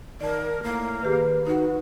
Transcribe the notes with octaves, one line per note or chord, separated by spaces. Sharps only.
D#3 A#4 D5 A5
A2 A#3
D#3 G4 G#4 B4
D#4 F#4 B4